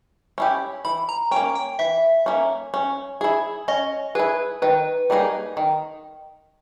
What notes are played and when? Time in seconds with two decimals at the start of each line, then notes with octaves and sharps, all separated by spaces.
0.38 C#4 E4 G4
0.85 E3 B5
1.09 A#5
1.31 C#4 G5
1.36 A#3
1.55 G5
1.79 E3 E5
2.26 A#3 C#4
2.74 C#4
3.21 E4 G#4
3.68 C#4 D#5
4.15 E4 G#4 B4
4.62 D#3 B4
5.10 G3 A#3 D#4 G#4
5.57 D#3